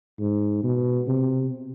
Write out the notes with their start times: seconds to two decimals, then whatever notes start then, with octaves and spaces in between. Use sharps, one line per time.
0.20 G#2
0.63 B2
1.08 C3